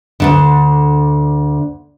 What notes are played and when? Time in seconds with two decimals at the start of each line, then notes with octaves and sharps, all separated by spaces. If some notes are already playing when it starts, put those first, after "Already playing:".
0.20 D2 G2 D3